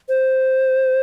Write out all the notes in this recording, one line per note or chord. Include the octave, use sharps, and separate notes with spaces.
C5